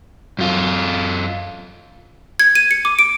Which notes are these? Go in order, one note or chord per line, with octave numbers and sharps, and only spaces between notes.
F#2 F4
G#6
D#7
C#7
D6
D7